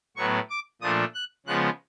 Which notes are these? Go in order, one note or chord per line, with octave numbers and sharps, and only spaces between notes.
A2 F#3 B3 C#6
D6
A#2 F3 A3 D4 D#6
F#6
C#3 F3 G#3 B3 F#6